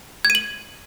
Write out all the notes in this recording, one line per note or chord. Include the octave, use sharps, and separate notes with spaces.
G#6
D#7
F#7